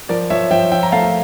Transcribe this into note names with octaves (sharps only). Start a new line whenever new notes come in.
F3 A#4 D5
F3 C#5 E5
F3 E5 G5
F3 E5 G5
A#5
A3 F5 A5